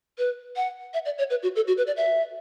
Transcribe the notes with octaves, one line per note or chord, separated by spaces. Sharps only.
B4
F#5
E5
D5
C#5
B4
F#4
A4
F#4
B4
D5
E5